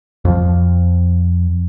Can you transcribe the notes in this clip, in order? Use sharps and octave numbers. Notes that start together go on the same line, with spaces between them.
F2 F3